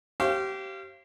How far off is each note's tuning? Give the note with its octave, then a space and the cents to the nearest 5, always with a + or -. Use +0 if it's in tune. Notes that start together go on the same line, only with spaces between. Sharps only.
G4 -25 C5 +40 F5 -30